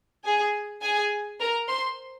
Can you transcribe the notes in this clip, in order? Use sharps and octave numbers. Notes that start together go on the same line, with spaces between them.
G#4 G#5
G#4 G#5
A#4 A#5
C5 C6